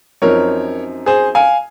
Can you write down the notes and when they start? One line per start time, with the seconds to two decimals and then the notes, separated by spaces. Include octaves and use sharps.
0.22 F#2 F3 C4 D#4 A#4 C#5
1.06 G#4 C5
1.35 F5 G#5